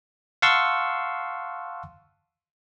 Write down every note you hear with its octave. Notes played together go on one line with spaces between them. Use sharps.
F5 F#5 A5 C6 C#6 E6